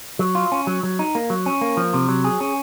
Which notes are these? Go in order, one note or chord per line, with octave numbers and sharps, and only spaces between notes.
F#3
F4
C#4
F#3
F#3
D#4
A#3
F#3
C#4
A#3
F3
C3
F#3
G#4
C#4